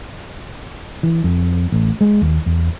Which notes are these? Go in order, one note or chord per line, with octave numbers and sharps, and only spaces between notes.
E3
F2
A1
G#3
D#2
E2